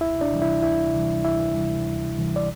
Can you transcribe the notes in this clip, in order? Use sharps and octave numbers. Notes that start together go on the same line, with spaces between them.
D2 E4 E5
D4 D5
C3 E3 G3
E4 E5
D2 E4 E5
C3 E3 G3
D2 E4 E5
C3 E3 G3
D2
C3 E3 G3
D5